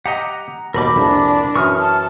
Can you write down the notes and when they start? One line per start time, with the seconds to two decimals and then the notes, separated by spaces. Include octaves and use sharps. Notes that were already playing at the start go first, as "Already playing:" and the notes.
0.06 G4 D#5 F#5 A#5
0.74 D#2 B2 G3 A#4 B5 D6
0.96 C2 F2 A#2 D4
1.56 F#2 E3 C#6 D#6 F6
1.79 A5